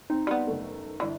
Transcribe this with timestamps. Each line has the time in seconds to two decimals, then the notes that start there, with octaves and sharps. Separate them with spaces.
0.10 C4 D#4
0.27 G3 B3
0.47 F#1 A3
1.00 G1 E3 D5